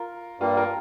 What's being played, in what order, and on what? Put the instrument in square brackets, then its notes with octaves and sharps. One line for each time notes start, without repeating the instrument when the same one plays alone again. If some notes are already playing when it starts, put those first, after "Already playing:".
Already playing: [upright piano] F4 A#4
[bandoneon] G2 G3 A#3 [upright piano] F4
[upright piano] F4 A#4